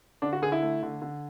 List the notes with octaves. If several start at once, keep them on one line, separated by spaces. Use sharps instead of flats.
D3 D4
F#4
D3 G#4
E4
A3
D3
D3